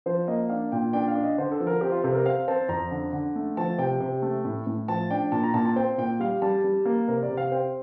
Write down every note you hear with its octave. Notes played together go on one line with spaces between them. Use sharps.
F3 C5
A#3 D#5
D4 F5
A#2 G5
D4 G5
F5
D4
D#5
D3 C5
A4
F3
A#4
C4 G4
F4
C3 A4
A#4
C4 F5
C4 A5
F2 A#5
D3
D3
A3
F3 A5
C3 G5
C3
A3
A2
A2
F3 A5
D4 G5
A#2 A5
A#5
A#2 A5
A5
C4 G5
A#2 G5
G3 F5
G3 A5
G3
A#3
C3 A#4
D5
C3
F5
C4 G5